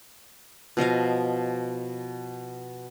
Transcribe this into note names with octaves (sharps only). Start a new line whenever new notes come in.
B2 F3 D#5 F5